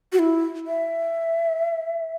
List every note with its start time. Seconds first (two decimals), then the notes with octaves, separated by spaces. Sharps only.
0.12 F#4
0.19 E4
0.67 E5